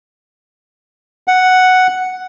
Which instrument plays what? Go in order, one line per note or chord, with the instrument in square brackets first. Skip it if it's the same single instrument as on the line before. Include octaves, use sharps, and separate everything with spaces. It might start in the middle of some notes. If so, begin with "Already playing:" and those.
[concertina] F#5